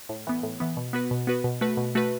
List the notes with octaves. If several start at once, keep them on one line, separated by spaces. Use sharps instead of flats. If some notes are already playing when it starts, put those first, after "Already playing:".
A2
E3 B3
A2
E3 B3
B2
B3 F#4 B4
B2
B3 F#4 B4
B2
A3 F#4 B4
B2
A3 F#4 B4